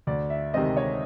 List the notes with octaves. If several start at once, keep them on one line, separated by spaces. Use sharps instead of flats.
D2 D5
E5
C3 D#3 G#3 C4 D#5
C#5